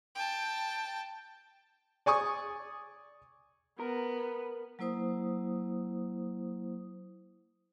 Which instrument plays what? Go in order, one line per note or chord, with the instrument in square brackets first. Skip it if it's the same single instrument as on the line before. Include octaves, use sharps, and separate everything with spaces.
[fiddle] G5 A5
[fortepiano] D5 G#5 C#6 D#6
[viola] B3 [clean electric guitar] A#4 A#5
[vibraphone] F#3 A#3 E4 C5 D#6